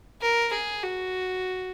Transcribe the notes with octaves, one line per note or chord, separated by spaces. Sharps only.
A#4
G#4
F#4